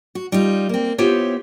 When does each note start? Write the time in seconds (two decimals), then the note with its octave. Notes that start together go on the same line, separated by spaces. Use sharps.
0.15 F#4
0.32 G3 D#4 F4
0.69 A#3 C4
0.98 B3 E4 F4 G4 C5 C#5